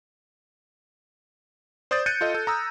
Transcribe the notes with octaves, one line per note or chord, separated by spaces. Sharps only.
C5 D5 D#6 G6 A6
F#6 G6 A6 C#7 D#7
F4 A4 D#5
A4
A#5 D#6 E6